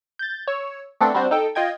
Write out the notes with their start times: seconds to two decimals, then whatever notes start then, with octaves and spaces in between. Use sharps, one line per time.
0.19 G6 A6
0.48 C#5 E6
1.01 A3 B3 C4 D4 A4
1.14 G3 C4 D4 F#4 C5
1.31 D#4 A4 G5
1.55 F4 D#5 G5 G#6